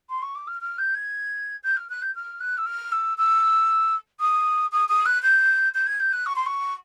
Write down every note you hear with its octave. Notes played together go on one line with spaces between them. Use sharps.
C6
C#6
D6
F6
F6
G6
G#6
G6
F6
F#6
G6
F6
F#6
E6
F6
E6
E6
D#6
D#6
D#6
F#6
G6
G6
G#6
G6
F#6
C#6
C6
C#6